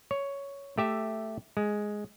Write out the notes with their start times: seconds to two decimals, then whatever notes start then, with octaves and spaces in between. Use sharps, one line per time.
0.11 C#5
0.78 A3 G4 E5
1.57 G#3